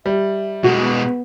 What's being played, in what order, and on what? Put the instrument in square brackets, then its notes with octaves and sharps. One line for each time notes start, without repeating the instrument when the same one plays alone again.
[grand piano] G3 [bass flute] E5
[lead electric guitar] B2 G#3 [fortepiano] F#4
[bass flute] B3